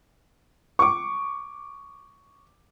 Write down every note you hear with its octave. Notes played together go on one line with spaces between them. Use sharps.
C#6 D6